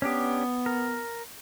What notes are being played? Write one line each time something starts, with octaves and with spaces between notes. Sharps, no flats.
B3 C#4 D4 G4
A#4